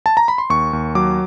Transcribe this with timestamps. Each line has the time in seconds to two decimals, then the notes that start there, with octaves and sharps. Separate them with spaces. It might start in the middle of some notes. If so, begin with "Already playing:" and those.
0.06 A5
0.17 A#5
0.28 B5
0.38 C6
0.50 D#2 C#6
0.73 D#2
0.95 F#3 D6